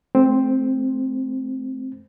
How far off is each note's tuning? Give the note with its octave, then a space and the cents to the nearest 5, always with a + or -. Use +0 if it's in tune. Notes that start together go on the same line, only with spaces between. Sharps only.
A3 -25 C4 +0